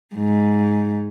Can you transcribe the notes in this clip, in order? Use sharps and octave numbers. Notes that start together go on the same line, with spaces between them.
G#2